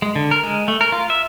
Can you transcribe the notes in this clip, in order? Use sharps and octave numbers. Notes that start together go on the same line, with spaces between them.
G#3
D3
A#4
G#3
A3
A#4
F4
E5